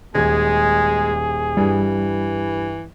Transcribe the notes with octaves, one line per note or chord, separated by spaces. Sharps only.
D#1 G#3 G#4 G#6
G2 E3 G3